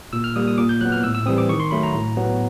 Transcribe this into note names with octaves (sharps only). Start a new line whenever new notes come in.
A#2 E6
F6
G3 A#3 D#6
D#6
A#2 D6
G6
F#3 B3 F#6
F6
A2 E6
E6
E3 G3 C4 D#6
D6
D#3 C#6
C6
F#3 A3 B5
A#5
A2
F#3 B3